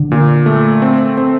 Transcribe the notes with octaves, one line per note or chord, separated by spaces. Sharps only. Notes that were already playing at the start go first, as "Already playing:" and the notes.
Already playing: D3
A#2
A3
C4
C4